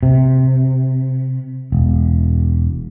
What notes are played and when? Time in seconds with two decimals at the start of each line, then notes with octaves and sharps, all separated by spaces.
0.03 C3
1.72 E1